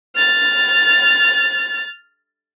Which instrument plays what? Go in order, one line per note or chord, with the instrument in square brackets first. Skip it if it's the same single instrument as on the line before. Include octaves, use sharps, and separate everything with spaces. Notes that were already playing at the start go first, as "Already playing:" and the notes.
[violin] F6 A6